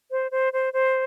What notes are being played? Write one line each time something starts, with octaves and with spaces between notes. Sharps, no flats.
C5
C5
C5
C5